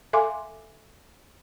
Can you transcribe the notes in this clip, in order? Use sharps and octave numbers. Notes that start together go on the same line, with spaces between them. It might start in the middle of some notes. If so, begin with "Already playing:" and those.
A4 E5 F5 G#5 C6 D6